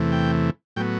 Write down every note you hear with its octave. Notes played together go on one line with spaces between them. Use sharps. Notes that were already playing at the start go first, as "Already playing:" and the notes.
Already playing: E2 C3 E3 A3
G5
A2 F#3 B3 G5